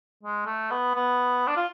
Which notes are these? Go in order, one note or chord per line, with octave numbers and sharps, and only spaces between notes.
G#3
A3
B3
B3
D4
F4